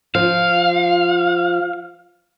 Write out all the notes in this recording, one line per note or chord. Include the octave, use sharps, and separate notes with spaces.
F3 F5